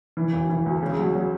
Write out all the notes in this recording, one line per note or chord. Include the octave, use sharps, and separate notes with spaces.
E3
E1
E3
D2
C#3
F#3
F#3